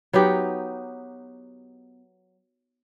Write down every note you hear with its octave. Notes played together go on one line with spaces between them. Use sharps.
F#3 B3 D#4 G4